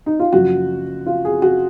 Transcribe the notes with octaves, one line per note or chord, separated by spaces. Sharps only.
D#4
F4
F#1 F#2 F3 F#4
F4
G#4
F#4